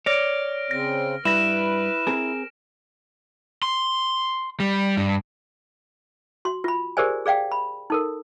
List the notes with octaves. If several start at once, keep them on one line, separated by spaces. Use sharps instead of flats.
C#5 D5 F6 A#6 D7
C#3 C4 A#6
G2 E4 B4 A#6 E7
C4 G#4 A#4
C6
G3
G2
F#4 C6
F4 B5
G4 G#4 A#4 C5 D5 G#5
G#4 D5 F5 G5
B5
D#4 A4 A#4